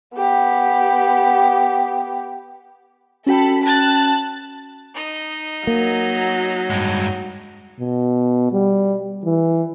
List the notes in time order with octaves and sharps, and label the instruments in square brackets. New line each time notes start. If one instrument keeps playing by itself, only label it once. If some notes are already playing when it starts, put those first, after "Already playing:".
[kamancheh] B3 G4
[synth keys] C#4 F#4 G5 [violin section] A4 B5
[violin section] A5 F#6 A6
[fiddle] D#4 D#5
[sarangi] F#3 [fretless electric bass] A#3
[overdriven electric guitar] G2 G#3
[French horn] B2
G3
E3